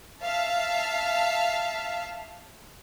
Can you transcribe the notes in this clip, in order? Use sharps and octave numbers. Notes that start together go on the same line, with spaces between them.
E5 F5 A5